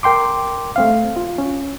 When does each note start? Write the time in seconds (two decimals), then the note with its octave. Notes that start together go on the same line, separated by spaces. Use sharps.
0.03 A#4 G5 C6 D6
0.76 A3 C4 F5
1.16 F4
1.38 C#4